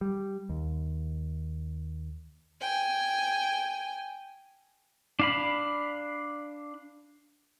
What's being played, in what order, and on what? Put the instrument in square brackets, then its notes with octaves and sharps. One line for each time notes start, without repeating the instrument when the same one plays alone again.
[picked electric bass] G3
D#2
[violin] G5 G#5
[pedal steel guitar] D4 F5 B5